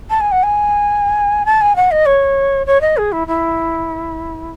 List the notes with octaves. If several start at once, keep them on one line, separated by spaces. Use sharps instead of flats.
A5
G#5
F#5
G#5
A5
G#5
F#5
D#5
C#5
C#5
D#5
G#4
E4
E4